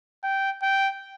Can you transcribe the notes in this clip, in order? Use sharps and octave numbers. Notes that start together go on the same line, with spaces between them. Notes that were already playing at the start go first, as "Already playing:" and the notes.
G5
G5